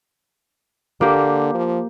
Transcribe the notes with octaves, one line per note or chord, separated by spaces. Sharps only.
D3 A#3 G4
F3